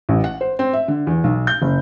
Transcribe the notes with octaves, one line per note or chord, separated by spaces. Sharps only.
A1
F#5
C5
C4
E5
D3
E2
B1
G6
F#1